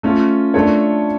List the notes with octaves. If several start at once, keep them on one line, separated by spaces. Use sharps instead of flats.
A3 C#4 F4
A3 D4 F4 A4 C#5